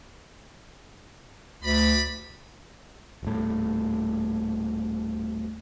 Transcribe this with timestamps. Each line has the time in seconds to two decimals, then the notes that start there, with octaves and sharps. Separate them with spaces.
1.63 D2 D5 B5
3.23 D#1 A2